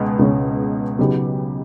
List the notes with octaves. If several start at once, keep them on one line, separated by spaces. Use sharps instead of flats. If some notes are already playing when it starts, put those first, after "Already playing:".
Already playing: C#2 B2 G#3
C#2 B2 G#3 C#4
C#3 F#3 B3 D#4 G4